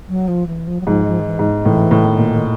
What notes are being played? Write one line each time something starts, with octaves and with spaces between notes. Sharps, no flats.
F#3
F3
E3
F3
F#3
G#2 F3
F3
D#3
E3
G#2
A2 E3
A2
D#3
A#2
D#3